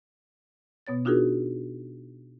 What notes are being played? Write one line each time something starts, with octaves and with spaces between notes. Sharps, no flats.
B2 B3 C#5 A6
D4 D#4 F4 F#4 G#4 A#4